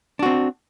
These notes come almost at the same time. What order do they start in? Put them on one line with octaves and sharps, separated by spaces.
D4 F#4 C4